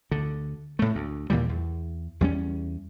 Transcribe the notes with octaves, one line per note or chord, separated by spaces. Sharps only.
D2 D3
A2 A3
D2
D#2 A#2 E3 G3
E2
E2 G3 C#4